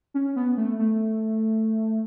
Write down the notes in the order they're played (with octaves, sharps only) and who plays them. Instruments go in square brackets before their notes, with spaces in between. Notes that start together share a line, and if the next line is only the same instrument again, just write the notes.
[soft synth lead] C#4
B3
A3
A3